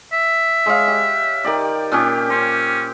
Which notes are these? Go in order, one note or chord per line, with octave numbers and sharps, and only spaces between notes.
E5
G#3 C#5 F5
G4
D#3 G4 D5
A#2 C#4 G4
C#4 C5